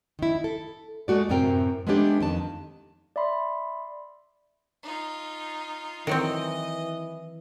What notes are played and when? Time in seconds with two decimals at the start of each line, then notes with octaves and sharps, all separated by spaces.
0.19 D#3 E4
0.44 A4
1.08 G#3 A3 F#4 D5
1.29 F#2 A2 C3 C4 A#4 G5
1.87 G#3 A3 B3 C#4 D4 G4
2.21 F2 D#3 A5
3.16 D5 E5 B5 C6
4.83 D#4 F4
6.07 D#3 E3 F#3 C4 D#5